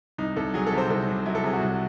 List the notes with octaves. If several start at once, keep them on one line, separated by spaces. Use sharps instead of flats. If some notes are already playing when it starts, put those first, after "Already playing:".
C2 D#4
C2 A4
F#3 G#4
A4
C3
C5
C2 A4
C2
F#3 E4
A4
C3 G#4
F#4
C2